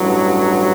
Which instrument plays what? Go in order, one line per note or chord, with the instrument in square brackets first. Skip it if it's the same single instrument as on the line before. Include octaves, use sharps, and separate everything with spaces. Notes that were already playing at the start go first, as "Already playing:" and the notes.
Already playing: [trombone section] A1 G2 F#3